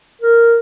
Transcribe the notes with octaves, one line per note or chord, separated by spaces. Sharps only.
A#4